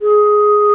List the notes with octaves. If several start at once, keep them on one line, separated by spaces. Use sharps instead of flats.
G#4